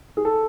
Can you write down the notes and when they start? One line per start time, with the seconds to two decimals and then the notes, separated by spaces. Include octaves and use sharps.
0.17 G#4
0.25 A4